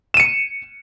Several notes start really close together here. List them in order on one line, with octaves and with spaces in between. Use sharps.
E7 D#7 C#7